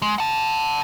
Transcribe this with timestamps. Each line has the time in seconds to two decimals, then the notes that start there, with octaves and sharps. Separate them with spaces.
0.02 G#3
0.18 F#5 A5